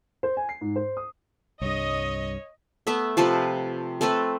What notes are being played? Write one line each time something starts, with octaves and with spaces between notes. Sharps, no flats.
C5
G#5
C7
G#2
C5
D#6
C2 G2 C#5 D#5
A3 B3 E5
C3 F3 A4 B4
A3 C4 A4 B4